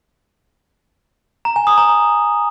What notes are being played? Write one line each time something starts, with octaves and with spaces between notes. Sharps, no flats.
A#5
G#5
D#6
A#5